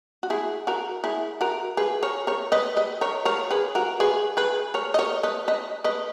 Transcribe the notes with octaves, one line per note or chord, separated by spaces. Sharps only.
F#4
E4 G#4
F#4 A#4
E4 G#4
F#4 A#4
G#4 B4
A#4 C#5
A#4 C#5
B4 D#5
B4 D#5
A#4 C#5
A#4 C#5
G#4 B4
F#4 A#4
G#4 B4
G#4 B4
A#4 C#5
D#5
A#4 C#5
B4 D#5
B4 D#5
B4 D#5